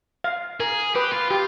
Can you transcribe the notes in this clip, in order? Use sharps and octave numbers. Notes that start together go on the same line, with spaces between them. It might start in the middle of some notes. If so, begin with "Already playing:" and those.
F5
G#4 A#4
G4 B4
F4
F4 G4